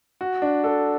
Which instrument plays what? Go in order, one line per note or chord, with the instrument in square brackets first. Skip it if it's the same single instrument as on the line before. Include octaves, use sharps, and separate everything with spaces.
[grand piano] F#4
D4
A4